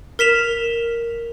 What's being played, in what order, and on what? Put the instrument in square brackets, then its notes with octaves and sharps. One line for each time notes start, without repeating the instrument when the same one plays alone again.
[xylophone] A#4 B6 E7 F7